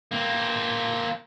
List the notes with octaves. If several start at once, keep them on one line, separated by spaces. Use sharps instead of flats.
A#3 C4